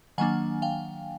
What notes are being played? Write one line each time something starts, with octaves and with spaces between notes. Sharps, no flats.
D#3 F#3 A#3 D4 F#5 G#5
F5 G5